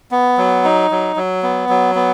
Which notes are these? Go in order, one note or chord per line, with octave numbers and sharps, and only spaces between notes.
B3
F#3
D#4
F#3
F#3
B3
F#3
B3